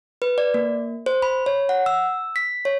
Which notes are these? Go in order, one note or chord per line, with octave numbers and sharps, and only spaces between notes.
B4
D5
A#3
C5
B5
C#5
F#5
E6
B6
C#5